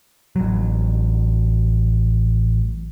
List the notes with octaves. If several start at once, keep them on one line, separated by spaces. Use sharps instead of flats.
A1 F#3